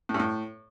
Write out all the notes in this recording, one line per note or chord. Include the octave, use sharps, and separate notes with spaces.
A2
G2
A2